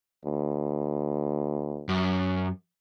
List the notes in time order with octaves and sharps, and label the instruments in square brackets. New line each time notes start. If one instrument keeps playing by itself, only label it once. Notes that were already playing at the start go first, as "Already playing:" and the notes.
[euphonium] D2
[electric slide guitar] F#2